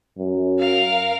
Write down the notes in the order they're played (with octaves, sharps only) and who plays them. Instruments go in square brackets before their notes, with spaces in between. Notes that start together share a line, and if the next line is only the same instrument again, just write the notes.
[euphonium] F#2
[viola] A#4 F5